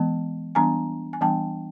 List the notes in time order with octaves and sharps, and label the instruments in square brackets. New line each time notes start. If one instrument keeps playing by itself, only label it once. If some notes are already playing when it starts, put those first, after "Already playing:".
Already playing: [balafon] E3 G#3 B3
E3 G3 B3 D4 G#5 A#5
G#5
E3 G3 B3 D4 G5 A5